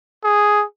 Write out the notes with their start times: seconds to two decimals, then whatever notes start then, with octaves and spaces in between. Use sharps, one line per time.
0.24 G#4